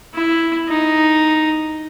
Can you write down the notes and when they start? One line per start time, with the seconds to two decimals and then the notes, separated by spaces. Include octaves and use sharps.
0.14 E4
0.69 D#4